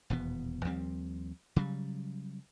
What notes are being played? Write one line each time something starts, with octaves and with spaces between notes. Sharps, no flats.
D#1 E2 B2 B3
D#2 F3 G3 C4
C#3 F#3 G3